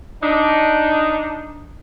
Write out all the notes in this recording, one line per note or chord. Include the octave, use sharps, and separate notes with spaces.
D4 D#4